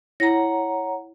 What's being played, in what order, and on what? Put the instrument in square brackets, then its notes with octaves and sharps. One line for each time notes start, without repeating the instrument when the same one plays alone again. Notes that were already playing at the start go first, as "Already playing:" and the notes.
[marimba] E4 A#6 [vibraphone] C#5 F#5 A#5